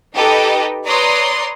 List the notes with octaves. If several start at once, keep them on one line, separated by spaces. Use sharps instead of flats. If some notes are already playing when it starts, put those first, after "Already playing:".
D#4 G4 A4 B4 D#5
B4 C#5 D5 A#5 C6 D#6